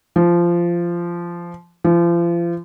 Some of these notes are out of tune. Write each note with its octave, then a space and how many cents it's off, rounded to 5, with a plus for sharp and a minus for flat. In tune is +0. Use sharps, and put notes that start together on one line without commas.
F3 -15
F3 -35